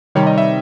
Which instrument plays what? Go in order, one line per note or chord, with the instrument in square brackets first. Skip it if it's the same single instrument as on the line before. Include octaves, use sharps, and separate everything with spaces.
[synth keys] C3 D#3 G3 [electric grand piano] C#5
[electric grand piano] D#5
E5